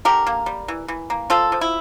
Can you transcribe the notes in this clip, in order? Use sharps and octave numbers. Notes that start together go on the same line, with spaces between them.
D3 G4 A#4
A#3
G3
E3
E3
A#3
F3 F4 A4
F3
E4